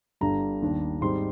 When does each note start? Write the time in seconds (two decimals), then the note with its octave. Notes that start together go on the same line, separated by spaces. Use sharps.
0.21 G1 G2 D3 G3 D4 A#5
0.62 D#2 D#3 G3 D4
1.01 G#2 G3 C4 D#4 C6